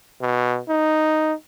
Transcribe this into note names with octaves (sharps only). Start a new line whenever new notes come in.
B2
D#4